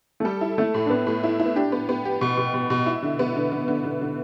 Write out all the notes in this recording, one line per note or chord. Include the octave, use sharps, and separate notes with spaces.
A3
G3 A4
E4
A3 E4
A2
D4
A2 B3
A2
E4
E4
B3
D4 G4
B3
B3
G4
B2
B2
B2
B2
E4
D3
B3
D3
D3
D3
D3
D3